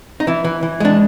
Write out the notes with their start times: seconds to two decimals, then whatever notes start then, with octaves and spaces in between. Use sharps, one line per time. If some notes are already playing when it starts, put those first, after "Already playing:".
0.20 D#4
0.27 E3 E4
0.45 E3
0.63 E3
0.80 G#3 D4